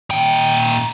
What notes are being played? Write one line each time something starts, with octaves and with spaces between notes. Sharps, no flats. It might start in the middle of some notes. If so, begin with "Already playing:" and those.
A#2 G5